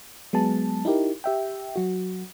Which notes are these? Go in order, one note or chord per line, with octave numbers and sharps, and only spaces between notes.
F#3 G#3 B3 G#4 A5
D#4 E4 G4 A#4
G4 E5 G5
F#3 F#4